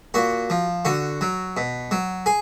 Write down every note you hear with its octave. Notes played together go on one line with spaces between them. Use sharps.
A#2 F#4
F3
D3 F#4
F#3
B2
F#3
G#4